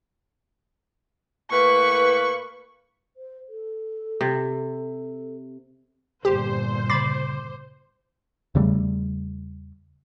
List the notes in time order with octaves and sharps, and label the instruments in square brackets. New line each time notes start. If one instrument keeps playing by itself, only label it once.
[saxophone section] A2 A#3 B4 [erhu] C#6
[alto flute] C5
A4
[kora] C3
[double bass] G1 A#2 [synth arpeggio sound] G4 [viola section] C5
[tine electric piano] C#3 D6 C7 [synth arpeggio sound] B5 A6
[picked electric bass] E2 C#3 G3 A3